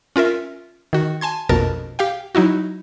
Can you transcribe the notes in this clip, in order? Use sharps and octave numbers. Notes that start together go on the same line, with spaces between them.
C#4 F4 A#4 E5
D#3 F#4
G#5 A5 C6 G#6
A#1 F2 B2 A#4 A5 A6
G4 F5 G5
F#3 D#4 E4 F#4